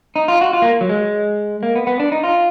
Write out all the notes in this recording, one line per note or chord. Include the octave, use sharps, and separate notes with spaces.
D#4
F4
F#4
F4
A#3
F#3
G#3
A#3
B3
B3
D4
D#4
F4